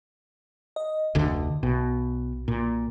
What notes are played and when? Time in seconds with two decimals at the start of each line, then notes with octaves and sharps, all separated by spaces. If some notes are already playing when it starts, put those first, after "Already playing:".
0.76 D#5
1.15 F1 D2 D3
1.63 B1 B2
2.48 A#2